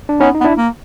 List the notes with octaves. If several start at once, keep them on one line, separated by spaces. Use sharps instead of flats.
D4
B3 C#4 D#4
D#4
B3
D4 E4
A#3